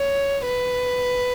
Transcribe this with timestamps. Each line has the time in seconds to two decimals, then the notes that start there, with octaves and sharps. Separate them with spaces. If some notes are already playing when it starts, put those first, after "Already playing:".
Already playing: C#5
0.46 B4